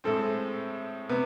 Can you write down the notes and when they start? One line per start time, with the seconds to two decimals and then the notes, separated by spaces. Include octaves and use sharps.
0.04 A2 G#3 C4 A4
1.09 C3 B3